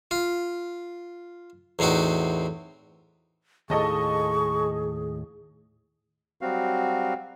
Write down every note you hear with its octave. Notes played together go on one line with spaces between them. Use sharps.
F4
E2 A2 C4 D#4 F#4
D#2 A2 G#4 A4 D#5 A5 C#6
F#3 G3 C4 F#4 F5